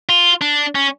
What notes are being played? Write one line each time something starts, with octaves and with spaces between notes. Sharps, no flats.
F4
D4
C#4